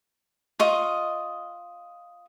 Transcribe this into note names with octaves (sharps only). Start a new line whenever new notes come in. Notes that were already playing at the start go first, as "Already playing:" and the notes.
F4 D#5 C#6